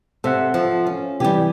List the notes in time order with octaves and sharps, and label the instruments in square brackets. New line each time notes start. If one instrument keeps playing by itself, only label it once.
[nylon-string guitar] C3 [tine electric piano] A4 E5 F#5
[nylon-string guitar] F3
C#4
[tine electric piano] C3 E3 G#5 [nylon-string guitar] G3 G4